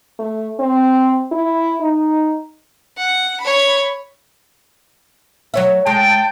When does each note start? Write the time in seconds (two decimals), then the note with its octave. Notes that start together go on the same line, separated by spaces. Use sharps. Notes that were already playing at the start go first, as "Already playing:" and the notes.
0.19 A3
0.60 C4
1.32 E4
1.80 D#4
2.97 F#5
3.40 C#5 B5
5.54 F#3 C#5 E5
5.87 G#3 G5 A5